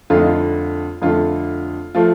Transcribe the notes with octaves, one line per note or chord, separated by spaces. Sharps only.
F2 D3 A3 F4
D#4
F4
F2 D3 A3 F4
F3 A3 F4